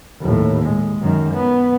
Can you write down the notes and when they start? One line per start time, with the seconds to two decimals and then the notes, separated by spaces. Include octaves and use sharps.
0.21 D#2 A2
0.64 G#3
1.01 F#2 D#3
1.34 B3